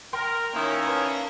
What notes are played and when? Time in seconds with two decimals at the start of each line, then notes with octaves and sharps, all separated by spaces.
0.13 A#4 G5 C6
0.54 A#2 D#3 A#3 C#4 E4 C#5
0.86 B4 A5